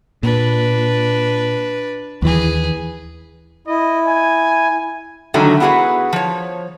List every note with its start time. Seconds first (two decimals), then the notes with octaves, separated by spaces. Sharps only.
0.23 A#2 D4 B4
2.22 D#2 E3 G#4 B4
3.67 E4 D#5
4.07 G#5
5.34 D3 D#3 F#3 G3 A3 D#4
5.60 B3 E4 F#4 G#4 A#4 B4
6.13 F3 C#5